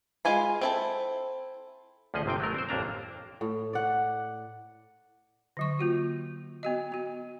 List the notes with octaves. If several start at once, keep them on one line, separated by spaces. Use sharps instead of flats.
G#3 F4 G#5 B5
C4 E4 A4
D2 F3 C#4 G#4 D#5
G1 C3 C4 G5
F#3 A3 A#4
C4 C5
A1 F2 A#3 D4 A#5
A2
D5 F#5
D3 F#3 C#6
A#3 F4 F#4
B3 F#4 D#5
B3 F#4